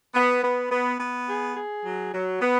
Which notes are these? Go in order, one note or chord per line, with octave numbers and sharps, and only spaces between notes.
B3
B3
B3
B3
G#4
G#4
F#3
F#3
B3